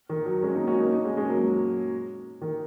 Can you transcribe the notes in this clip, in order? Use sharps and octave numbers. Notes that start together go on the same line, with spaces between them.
D#3
F#3
G#3 C#4
A#3 D#4
C#4 F#4
A#3 D#4
A#3 D#4
G#3 C#4
G#3 C#4
F#3 A#3
F#3
D#3